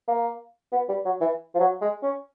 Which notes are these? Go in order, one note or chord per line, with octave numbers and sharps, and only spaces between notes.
A#3
B3
G3
F#3
E3
F3
F#3
G#3
C#4